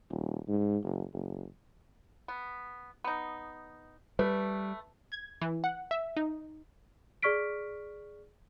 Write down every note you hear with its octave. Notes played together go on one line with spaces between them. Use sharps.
D#1
G#2
F#1
F#1
B3
B3 D#4
G3 A3 B4
G#6
E3
F#5
E5
D#4
G#4 D5 C#6 F6 B6 D7